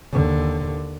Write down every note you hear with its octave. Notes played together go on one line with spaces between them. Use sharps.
D#2 D3